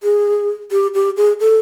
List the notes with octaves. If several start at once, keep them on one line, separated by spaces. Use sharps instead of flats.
G#4
G4
G4
G#4
A4